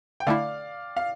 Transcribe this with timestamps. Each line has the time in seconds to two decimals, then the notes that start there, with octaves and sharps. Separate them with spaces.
0.20 G5
0.27 D3 A3 E4 D5 F5
0.97 F5